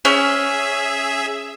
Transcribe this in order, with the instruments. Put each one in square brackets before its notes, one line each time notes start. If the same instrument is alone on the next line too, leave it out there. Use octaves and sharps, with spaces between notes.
[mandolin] C#4 [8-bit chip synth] G#4 E5